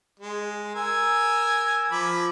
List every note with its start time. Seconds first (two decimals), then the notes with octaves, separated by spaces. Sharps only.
0.20 G#3
0.75 A#4 G#5 E6
1.91 F3 B5 D6